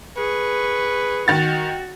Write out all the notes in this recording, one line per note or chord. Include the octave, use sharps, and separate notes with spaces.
G#4 B4 C#6
D#3 F#4 A6